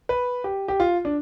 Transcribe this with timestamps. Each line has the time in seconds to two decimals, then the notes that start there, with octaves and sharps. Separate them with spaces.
0.09 B4
0.44 G4
0.68 G4
0.80 F4
1.05 D4